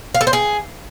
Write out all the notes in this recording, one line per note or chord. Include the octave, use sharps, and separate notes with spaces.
F5
A4
C5
G#4